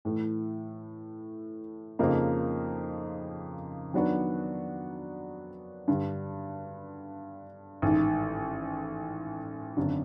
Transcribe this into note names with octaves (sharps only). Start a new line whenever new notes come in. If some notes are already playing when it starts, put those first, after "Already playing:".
A2 E3 A3
F2 C#3 F3 A#3 D#4
D#3 F#3 B3 D4 F#4
G2 D3 G3
A1 G#2 D#3
G#1 F#2 D3 F#3